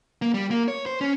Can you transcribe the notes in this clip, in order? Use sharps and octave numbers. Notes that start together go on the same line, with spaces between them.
A#3
G3
A#3
C#5
C5
C#4